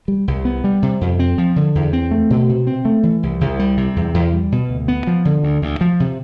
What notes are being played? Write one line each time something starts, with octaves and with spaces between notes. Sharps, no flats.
G3
C2
B3
G3
C3
F2
C4
F3
D3
E2
C4
A3
B2
C3
C4
A3
E3
C2
C2
G3
C3
E2
E2
G3
B2
D2
B3
F3
D3
D2
D2
F3
C3